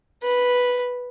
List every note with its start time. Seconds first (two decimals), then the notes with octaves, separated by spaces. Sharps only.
0.23 B4